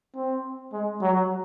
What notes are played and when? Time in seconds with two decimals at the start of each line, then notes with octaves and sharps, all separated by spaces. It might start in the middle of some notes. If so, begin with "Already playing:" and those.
0.15 C4
0.73 G#3
1.02 F#3